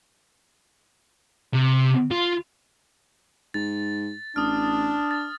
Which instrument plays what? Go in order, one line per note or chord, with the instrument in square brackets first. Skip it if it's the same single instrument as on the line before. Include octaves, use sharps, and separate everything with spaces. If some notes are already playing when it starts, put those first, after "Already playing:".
[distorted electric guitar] C3
F4
[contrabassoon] G#2 [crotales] A6
[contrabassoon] A1 [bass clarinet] D4 [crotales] D#6 F6
[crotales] A6